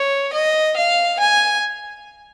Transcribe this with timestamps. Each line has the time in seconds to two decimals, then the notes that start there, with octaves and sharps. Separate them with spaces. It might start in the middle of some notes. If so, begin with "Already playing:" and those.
Already playing: C#5
0.33 D#5
0.77 F5
1.19 G#5